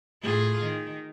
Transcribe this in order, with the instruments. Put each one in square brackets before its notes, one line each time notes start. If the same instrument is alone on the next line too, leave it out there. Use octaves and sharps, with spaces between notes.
[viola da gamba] A2 F4 G#4
D#3